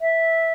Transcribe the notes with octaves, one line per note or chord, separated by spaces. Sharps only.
E5